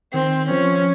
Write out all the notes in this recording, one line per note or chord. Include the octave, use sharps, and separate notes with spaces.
D#3 C4
F3 C#4